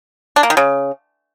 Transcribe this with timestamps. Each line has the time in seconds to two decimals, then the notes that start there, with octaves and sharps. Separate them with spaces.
0.36 D4
0.43 A#3
0.50 D#3
0.57 C#3